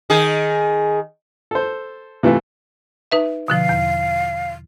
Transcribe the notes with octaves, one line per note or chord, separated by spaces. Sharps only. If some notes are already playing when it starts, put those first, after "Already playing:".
D#3 G#4
A4 C5
C3 E3 A3 E4 F4
D#4 B4 E5
B2 D3 F3 F5
E2